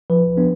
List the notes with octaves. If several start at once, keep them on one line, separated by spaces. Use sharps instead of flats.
F3 B4
B3 D4